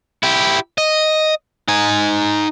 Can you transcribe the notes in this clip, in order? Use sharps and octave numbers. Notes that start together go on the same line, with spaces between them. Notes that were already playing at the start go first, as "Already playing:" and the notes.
E4 G4
D#5
D#4 G#5